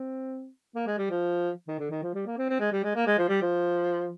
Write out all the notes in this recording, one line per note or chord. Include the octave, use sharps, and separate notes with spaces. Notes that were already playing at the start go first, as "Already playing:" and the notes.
Already playing: C4
A#3
G#3
G3
F3
D#3
D3
D#3
F3
G3
A#3
C4
C4
G#3
G3
G#3
A#3
G#3
F3
G3
F3